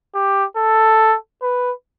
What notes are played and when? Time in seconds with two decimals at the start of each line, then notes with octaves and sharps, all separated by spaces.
0.15 G4
0.57 A4
1.42 B4